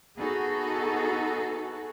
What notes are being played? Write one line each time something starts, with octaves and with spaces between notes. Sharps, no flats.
B3 D#4 F#4 G#4 A4